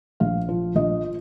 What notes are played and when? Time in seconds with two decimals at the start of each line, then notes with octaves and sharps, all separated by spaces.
0.20 A#1 F5
0.49 F3
0.75 A#1 D#5